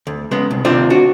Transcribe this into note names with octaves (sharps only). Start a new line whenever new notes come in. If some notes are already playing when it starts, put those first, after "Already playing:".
D2
C#3 G#3 B3
C2
D#2 C3 C4 D4 F4
D4 F#4